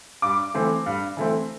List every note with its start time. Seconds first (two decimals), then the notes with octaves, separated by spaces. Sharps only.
0.22 G2 D6
0.54 E3 A3 C4
0.86 G2
1.17 E3 A3 C4